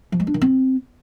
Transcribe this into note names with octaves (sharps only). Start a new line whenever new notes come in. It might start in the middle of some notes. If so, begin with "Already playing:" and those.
F3
G#3
D4
D#3
C4